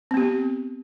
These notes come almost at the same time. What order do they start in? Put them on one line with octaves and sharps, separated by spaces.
C4 B3 G4